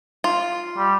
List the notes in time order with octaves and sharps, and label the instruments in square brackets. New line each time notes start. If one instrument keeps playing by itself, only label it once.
[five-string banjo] F4
[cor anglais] G3